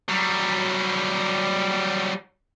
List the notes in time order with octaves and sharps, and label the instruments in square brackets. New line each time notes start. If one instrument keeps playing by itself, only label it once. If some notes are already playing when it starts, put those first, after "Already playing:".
[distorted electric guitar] F#3 G3